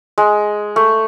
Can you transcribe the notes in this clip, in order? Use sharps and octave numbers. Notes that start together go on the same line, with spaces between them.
G#3
A3